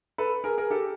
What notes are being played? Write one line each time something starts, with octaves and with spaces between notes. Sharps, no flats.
A4 B4
G#4 A#4
G#4 A#4
G4 A4